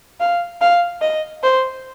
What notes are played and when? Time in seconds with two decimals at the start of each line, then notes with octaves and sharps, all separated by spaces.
0.20 F5
0.61 F5
1.01 D#5
1.43 C5